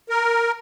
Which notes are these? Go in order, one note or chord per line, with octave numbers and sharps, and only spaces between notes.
A#4